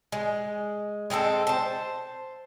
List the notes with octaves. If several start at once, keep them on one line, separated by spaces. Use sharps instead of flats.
G#3
G#3 C4 E4 A4
C5 A5